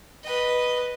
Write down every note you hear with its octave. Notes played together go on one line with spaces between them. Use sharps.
B4 D#5